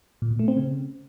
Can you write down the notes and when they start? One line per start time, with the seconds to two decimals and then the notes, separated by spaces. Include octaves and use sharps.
0.22 A#2
0.31 B2
0.39 A3
0.48 C4
0.57 C#3